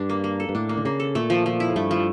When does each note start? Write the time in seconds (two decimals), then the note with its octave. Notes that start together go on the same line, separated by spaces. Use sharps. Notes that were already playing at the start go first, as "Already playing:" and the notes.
Already playing: G2 D4
0.09 A#3
0.24 A#3
0.40 A4
0.49 G2
0.55 A2 D4
0.69 A#3
0.77 D3
0.85 C#3 A#3
1.00 A4
1.15 A#2 A3
1.30 F3
1.46 F3
1.60 E4
1.70 A2
1.76 G2 A3
1.91 F3